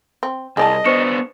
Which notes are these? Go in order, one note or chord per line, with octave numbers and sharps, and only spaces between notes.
C4
C2 G#4 D5 D#5 A5
B3 D4 C5 C#6 C#7